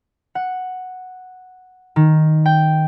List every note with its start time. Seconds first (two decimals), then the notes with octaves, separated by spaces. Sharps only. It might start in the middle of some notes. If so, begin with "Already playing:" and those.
0.35 F#5
1.96 D#3
2.46 G5